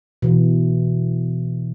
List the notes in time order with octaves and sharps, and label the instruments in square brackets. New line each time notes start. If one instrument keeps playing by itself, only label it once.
[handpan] B2 E3